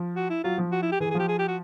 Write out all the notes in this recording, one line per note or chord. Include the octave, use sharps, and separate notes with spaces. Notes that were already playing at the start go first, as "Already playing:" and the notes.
Already playing: F3
F#4
E4
F#3 F4
F3
F#4
E4
G4
E3 G#4
G#4
F3 G4
G#4
G4
F#4